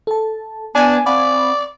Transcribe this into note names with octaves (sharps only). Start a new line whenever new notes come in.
A4 A5
B3 D4 D5 G#5
C4 D5 F5 F#5 B5